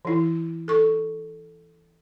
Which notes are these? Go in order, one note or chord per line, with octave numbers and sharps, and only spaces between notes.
E3 E4
A4 C#6